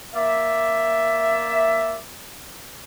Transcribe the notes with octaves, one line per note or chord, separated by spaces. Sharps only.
A#3 D5 E5